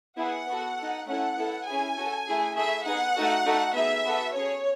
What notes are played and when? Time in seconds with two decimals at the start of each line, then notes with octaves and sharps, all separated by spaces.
0.18 B3 E4 G#4 F#5
0.48 B3 F#4 A4
0.78 D#4 A4
1.07 A3 C#4 E4 A4 F#5
1.38 B3 E4 A4
1.67 C#4 E4 G#4 G#5
1.97 C#4 F#4 A4
2.27 A3 E4 G#4
2.56 A3 E4 G#4 E5
2.86 B3 D#4 G#4 F#5
3.15 A3 D#4 F#4 A4
3.45 A3 D#4 F#4 A4
3.75 B3 D#4 G#4 E5
4.05 B3 F#4 A4
4.35 C#4 G#4 C#5